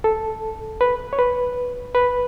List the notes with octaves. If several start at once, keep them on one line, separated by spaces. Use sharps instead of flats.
A4
B4
C#5
B4
B4